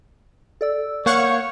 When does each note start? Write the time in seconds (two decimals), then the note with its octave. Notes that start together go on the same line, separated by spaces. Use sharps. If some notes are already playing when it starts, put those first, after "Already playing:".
0.61 A4 D5 E6
1.06 A#3 C#5 F5 F#5 C#6 G6